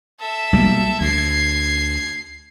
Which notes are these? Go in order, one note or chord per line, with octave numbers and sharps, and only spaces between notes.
A4 E5
B1 G3 A#3
D2 G#6 C7